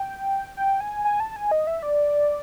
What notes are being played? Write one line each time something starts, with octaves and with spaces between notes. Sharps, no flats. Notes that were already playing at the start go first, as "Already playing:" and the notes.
Already playing: G5
G5
G#5
G#5
A5
G#5
D#5
E5
D5